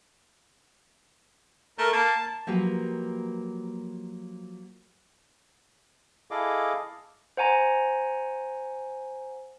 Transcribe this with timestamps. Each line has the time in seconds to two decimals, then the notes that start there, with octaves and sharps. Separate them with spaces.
1.78 A3 A#4
1.93 A#3 A5
2.47 F3 F#3 A#3 G4 B4
6.31 E4 G#4 A4 D#5 F5 D6
7.37 C5 F#5 G#5 A#5